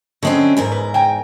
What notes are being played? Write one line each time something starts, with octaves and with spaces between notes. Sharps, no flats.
D3 F#3 C4 C#4 E4 D#5
E2 G#2 A#4
B4
G5 G#5 A#5